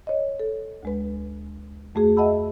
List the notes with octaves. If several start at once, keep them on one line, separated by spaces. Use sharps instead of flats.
C#5 D#5
A4
D2 G#3 B4
F2 A3 F#4 G#4
D#5 E5 F#5 A5 B5 E6